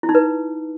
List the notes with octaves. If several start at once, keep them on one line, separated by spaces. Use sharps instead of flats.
E4
D#4
B4